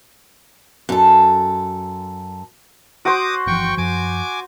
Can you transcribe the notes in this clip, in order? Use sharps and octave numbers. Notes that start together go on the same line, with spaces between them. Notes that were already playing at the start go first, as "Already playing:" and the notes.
F#2 A4
F#4 C5 D6 D#6
G1 E3 F3 G5 C#6
F#2 F3 G#5 D6